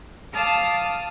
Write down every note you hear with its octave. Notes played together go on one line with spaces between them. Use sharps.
F5 A5 D6 D#6 F6